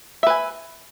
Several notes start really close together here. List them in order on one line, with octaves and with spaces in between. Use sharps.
E5 B4 G#5